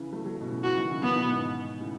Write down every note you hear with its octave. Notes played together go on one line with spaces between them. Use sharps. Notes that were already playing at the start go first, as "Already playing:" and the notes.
Already playing: C#3 E3
F#3 A3
F#3 A3
B2
A2 C#3
C#3 E3 F#4
D#3 F#3
C#3 E3
D#3 F#3 B3
B2 D#3
G#2 B2
A2 C#3